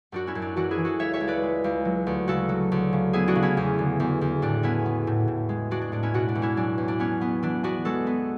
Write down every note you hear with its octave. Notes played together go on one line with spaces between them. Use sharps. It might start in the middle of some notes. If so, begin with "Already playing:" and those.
F#2 D4 F#4
C#4 E4
F#2
D4
E3 D4 F#4
E4 G#4
E3
F#4 A4
C#2 C#5 E5
C#5 E5
C#2
B4 D5
G#3
C#2
F#3
D2
C#3 F#4 A4
F#3
D2
C#3
B3 E4 G#4
D4 F#4
C#3
C#4 E4
E2
D3
E2
E2
A2 D4
B3 C#4 E4
B3
A2
A2
G#3
G#3 D4 F#4
D4
A2 D4
C#4 E4
B2 D4 F#4
D4
E2
C#4 E4
F#3 D4
E2
D4
B3 C#4
B3
E3 D4
B3 D4 F#4
G#3 F#4 A4
B3